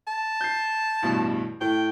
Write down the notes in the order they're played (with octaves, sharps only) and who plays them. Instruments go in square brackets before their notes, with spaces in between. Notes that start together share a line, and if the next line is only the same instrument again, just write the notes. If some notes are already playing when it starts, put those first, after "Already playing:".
[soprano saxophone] A5
[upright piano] G6 C7
A1 G2 B2
[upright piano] A2 [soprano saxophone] G5